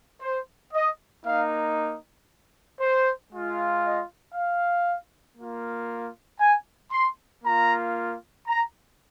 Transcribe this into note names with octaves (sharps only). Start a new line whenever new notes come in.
C5
D#5
A#3 D#4 F5
C5
G#3 F4
D#5
F5
A#3 F4
G#5
C6
A#3 F4 A#5
A#5